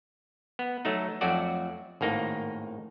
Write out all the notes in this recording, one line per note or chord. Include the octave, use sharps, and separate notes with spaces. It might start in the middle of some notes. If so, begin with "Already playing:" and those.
B3
F#3 A3 D#4
F2 F#3 A3 F#4 D5
G#1 A2 A#3 D#4